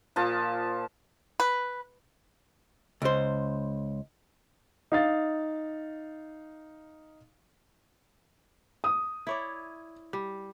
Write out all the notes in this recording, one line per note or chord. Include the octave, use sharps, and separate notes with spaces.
A#2 F3 A5
B4
C#2 C5
D#4 F5 A6
D#6
E4 C#5 D5
G3